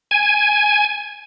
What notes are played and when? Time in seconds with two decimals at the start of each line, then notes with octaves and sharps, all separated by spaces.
0.11 G#5